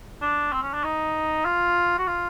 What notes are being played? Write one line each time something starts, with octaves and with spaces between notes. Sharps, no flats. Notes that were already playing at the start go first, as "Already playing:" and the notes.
D4
C4
C#4
D4
D#4
F4
F#4
F4